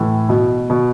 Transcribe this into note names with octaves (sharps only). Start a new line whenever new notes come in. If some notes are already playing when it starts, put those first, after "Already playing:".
Already playing: A2 E3
B2
B2